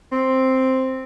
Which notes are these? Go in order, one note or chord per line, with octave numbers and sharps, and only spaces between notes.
C4